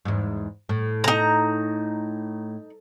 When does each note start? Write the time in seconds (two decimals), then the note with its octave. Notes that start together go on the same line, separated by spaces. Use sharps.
0.05 E2 G#2
0.69 A2
1.04 D#4 A#5